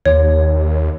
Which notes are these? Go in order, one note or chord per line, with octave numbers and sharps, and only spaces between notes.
D#2 C#5